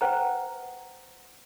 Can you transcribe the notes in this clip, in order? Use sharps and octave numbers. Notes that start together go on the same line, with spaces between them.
B4 C5 F#5 G5 A#5